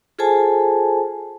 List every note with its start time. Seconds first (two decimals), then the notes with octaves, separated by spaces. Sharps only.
0.19 F4 G#4 A4 C5 G#5 A5